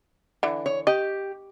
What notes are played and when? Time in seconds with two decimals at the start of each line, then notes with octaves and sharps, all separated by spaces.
0.43 D3 E3
0.66 C#5
0.87 G4 D#5